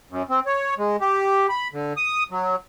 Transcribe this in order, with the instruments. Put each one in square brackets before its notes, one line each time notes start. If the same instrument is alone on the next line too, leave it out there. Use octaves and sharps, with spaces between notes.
[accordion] F#2
C4
C#5
G#3
G4
B5
D3
D#6
F#3